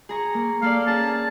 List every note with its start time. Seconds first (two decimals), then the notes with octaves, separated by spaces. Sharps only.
0.09 G#4 A#5 C#6
0.34 A#3
0.62 A#3 A4 D5 F5
0.87 C#4 G#4 A5